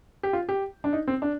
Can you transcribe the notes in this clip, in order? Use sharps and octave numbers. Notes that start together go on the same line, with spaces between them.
G4
F4
G4
D4
D#4
C4
D4